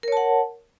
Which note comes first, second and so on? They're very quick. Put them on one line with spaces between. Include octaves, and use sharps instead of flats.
A#4 C#5 A5 F#5